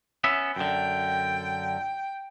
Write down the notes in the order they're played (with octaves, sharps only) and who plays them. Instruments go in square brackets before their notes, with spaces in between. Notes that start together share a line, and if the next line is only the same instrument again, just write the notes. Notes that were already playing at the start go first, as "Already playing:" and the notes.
[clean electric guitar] B3 C#4 E5
[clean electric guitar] F#2 D3 [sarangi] G5